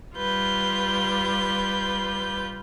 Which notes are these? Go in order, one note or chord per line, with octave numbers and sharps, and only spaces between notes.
G3 F4 B4 G6